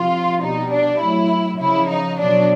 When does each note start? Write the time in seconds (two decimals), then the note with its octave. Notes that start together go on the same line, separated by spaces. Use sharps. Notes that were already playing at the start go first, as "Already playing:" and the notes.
Already playing: C3 F3 F4
0.41 B2 G3 D#4
0.70 D4
0.99 A2 F#3 E4
1.58 C#3 F3 E4
1.89 D#4
2.18 B2 F#3 D4